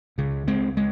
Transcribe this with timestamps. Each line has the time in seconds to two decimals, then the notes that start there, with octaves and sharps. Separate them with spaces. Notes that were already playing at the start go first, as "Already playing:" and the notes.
0.18 C#2 C#3
0.48 G#3 C4
0.77 G#3